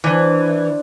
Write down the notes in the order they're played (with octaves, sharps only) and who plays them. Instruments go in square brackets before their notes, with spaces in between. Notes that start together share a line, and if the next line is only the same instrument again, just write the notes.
[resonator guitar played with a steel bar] E3 [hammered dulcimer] D4 C5